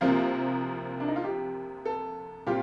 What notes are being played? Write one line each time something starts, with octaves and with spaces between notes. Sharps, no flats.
C2 C3 F3 A#3 F4
D4
D#4
F4
G4
A4
A#2 G3 C4 F4 G4